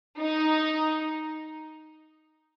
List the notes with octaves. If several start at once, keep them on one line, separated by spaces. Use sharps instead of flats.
D#4